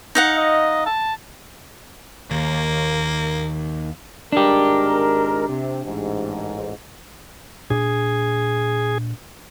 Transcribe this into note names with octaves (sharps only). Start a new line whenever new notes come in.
D#4 F5 F#5
D#5
A5
D#2 A#3
G#1 G#3 D4 G4 A#4
C3
A1 G#2
A#2 D4 G#4